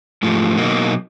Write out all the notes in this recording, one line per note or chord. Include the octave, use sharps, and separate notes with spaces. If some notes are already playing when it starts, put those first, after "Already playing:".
G#2 F3 A3
B2 F#3 A#3 D#4